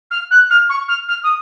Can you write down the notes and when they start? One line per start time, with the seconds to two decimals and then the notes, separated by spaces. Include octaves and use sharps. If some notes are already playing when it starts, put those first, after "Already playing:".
0.10 F6
0.30 F#6
0.50 F6
0.69 C#6
0.88 F6
1.08 F6
1.23 D#6